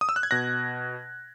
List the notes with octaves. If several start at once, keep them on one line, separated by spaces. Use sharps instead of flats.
D#6
E6
F#6
G#6
B2 F#6 A#6